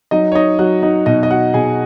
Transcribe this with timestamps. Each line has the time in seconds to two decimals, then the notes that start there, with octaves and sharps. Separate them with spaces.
0.11 F#3 D#4 D#5
0.32 C#5
0.35 D#4 D#5
0.59 F#3 F#4 F#5
0.82 D#4 D#5
1.06 B2 D#4 D#5
1.23 D#5
1.31 F#4 F#5
1.54 B2 G#4 G#5